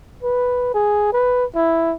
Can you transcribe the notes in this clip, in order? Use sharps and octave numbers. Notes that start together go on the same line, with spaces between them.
B4
G#4
B4
E4